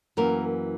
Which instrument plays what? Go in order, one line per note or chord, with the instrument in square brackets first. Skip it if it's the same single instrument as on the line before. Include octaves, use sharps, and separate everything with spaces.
[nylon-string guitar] F#2 E3 A#3 A#4